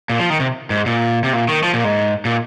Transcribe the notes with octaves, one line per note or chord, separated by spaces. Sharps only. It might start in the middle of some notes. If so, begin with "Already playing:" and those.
A#2
F3
D#3
C3
G#2
A#2
C3
A#2
D#3
F3
A#2
G#2
A#2